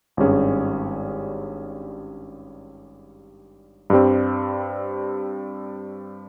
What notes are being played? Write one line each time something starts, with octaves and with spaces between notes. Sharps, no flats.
G#1 G2 G3 C#4 G#4
G2 G3 C4